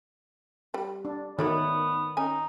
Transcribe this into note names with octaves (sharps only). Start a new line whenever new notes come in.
G3 B4
D4
D#3 A3 B3 C#5 D5 E5
C#4 D#4 G#5